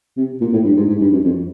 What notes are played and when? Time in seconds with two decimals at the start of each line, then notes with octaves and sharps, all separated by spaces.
0.17 C3
0.41 A#2
0.53 A2
0.65 G2
0.77 G#2
0.89 G#2
1.01 G2
1.13 F#2
1.25 F2